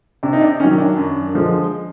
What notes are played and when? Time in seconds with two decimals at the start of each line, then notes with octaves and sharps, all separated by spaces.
0.23 C3 D4
0.33 D#4
0.41 D4
0.60 D#3 F#3 C#4
0.78 D4
0.97 F#2
1.34 D3 F3 G#3